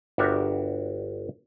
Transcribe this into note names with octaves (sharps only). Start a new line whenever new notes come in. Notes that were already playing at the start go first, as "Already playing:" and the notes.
G1 D4 F#4 G4 A#4 E5